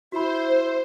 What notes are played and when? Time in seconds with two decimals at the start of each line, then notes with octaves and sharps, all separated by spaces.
0.12 E4 F#4 C5 B5